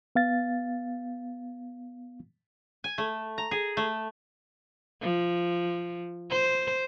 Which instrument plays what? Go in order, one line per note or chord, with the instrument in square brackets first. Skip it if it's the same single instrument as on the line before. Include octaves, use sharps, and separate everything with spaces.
[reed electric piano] B3 F5 A6
[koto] G#5
A3
A#5
G#4
A3
[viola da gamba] F3
C5